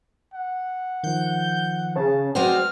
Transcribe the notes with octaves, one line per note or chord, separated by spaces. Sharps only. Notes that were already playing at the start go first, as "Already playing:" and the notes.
F#5
D#3 F3 G6
C#3 A5
G#3 C4 F#4 B4 C5 D5 G5 F6